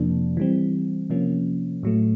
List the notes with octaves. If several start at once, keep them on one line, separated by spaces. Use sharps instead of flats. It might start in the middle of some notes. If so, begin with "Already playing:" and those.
Already playing: F2 C3 F3 A#3 D4
E3 G3 C4
C3 F3 A#3 C#4
A2 F#3 A3